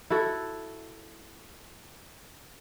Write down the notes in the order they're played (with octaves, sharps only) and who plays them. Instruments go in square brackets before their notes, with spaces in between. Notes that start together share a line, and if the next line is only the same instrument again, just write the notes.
[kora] E4 F#4 A4